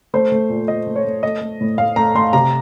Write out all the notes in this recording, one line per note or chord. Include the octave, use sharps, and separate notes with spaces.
A3 C5
A3
A#2
A#2 D#5
A3
C#5
A3
A3 D#5
A3
A2
A2 F5
A3 A#5
A3 C6
C3 A#5